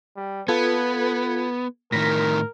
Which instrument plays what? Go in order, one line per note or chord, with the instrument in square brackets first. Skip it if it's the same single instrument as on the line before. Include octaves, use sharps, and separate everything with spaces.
[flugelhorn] G3
[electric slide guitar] B3 [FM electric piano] F4 A4 G#6 [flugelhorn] B4
[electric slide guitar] A2 D#3 [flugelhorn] A#4 [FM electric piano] A#6 B6